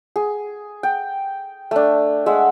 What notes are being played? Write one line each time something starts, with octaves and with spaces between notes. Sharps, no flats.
G#4
G5
A3 D4
G#3 E5 F#5